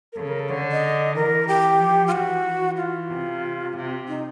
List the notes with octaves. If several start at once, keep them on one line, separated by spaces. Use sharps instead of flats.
A#4
C#3 A4
A#4
A4
D3 C#5
D#5
E3 A#4
G4
F3
F4
E3 F#4
E3
F4
C3
C3
D#4